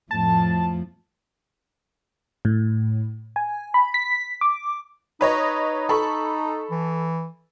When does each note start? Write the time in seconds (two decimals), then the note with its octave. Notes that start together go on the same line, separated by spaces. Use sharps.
0.11 F2 A2 F3 A5
2.45 A2
3.36 G#5
3.74 B5
3.94 B6
4.41 D6
5.21 D#4 B4 C#5 D#5
5.89 A4 B5 C#6
6.71 E3